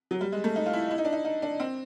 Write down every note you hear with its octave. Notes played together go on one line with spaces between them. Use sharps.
F#3
G3
G#3
A3
D#4
F4
E4
E4
D#4
D4
D#4
D#4
D4
C4